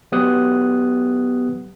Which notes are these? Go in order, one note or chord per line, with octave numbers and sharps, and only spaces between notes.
F#3 B3 G4 D#6 F#6